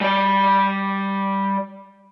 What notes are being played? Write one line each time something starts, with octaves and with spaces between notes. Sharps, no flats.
G3 D5